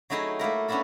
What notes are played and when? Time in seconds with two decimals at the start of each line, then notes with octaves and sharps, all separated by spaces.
0.10 F#3 A3 D#4 E4 G#4
0.39 A3 A#3 E4 A#4
0.68 B3 C#4 D4 E4 F#4 A4